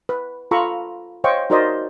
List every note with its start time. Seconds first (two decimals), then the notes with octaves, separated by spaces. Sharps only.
0.09 B4
0.51 F4 A4 A#5 B5 C#6 E6
1.24 C5 C#5 D#5 F5 G5 C#6
1.50 D#4 F#4 A#4 C5 D5 D#5